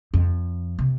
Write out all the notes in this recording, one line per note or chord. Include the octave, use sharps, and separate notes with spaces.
F2
C3